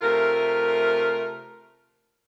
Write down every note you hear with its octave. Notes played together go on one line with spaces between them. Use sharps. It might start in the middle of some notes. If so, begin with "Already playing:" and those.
C3 A3 F4 A#4